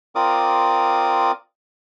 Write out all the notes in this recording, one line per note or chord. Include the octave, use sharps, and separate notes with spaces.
C4 F4 A#4 D5 D6 D#6